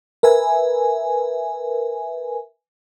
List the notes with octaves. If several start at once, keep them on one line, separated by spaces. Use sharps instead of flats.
A#4 B4 E5 G#5